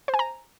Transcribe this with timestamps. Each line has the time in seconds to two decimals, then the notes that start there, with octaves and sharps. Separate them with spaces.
0.08 C5
0.14 G#5
0.19 A#5